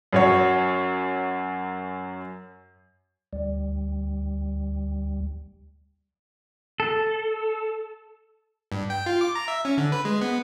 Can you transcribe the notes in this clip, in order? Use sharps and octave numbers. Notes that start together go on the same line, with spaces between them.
F#2 F#3 C#5
D2 G3
A4
G2
G5
F4
D6
A#5
E5
C#4
D3
B4
G#3
B3